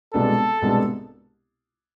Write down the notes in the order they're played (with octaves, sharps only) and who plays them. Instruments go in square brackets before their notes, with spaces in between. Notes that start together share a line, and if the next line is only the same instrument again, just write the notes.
[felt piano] C2 B2 G#3 B3 D4 [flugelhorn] A4
[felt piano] C2 B2 G#3 B3 D4